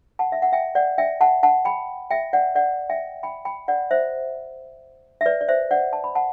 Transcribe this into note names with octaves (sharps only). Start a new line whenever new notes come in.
F#5 A5
E5
F#5
E5 G5
D5 F#5
E5 G5
F#5 A5
F#5 A5
G5 B5
E5 G5
D5 F#5
D5 F#5
E5 G5
G5 B5
G5 B5
D5 F#5
C5 E5
E5
B4 D5
D5
C5 E5
D5 F#5
A5
B5
F#5 A5